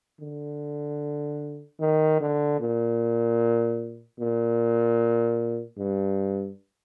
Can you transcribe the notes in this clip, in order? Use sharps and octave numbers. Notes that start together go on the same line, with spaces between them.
D3
D#3
D3
A#2
A#2
G2